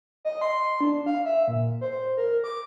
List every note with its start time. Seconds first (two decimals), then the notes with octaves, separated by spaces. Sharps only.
0.25 D#5
0.41 C6
0.81 D4
1.06 F5
1.25 E5
1.48 A#2
1.81 C5
2.17 A#4
2.44 D6